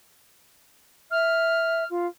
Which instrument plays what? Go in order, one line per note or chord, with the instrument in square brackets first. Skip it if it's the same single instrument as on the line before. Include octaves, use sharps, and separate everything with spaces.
[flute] E5 [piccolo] F6
[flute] F4